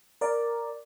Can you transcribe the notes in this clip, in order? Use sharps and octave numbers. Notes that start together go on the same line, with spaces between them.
A#4 D5